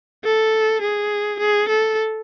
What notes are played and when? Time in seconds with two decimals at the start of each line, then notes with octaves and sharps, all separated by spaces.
0.25 A4
0.82 G#4
1.39 G#4
1.68 A4